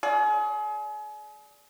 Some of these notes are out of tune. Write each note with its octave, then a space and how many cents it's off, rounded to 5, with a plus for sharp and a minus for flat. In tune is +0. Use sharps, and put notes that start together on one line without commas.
G#4 +35 D5 -15